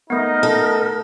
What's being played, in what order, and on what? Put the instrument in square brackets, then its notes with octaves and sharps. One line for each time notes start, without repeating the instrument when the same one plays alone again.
[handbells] A3 B3 [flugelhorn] D#4 [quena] A#4
[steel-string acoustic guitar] A4